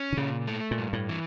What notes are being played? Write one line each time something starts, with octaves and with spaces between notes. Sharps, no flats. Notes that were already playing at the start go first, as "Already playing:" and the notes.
Already playing: C#4
D3
A#2 C#3
A3
A#2
G2
A2
E3